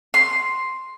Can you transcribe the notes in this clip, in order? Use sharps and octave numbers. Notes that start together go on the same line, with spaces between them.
C6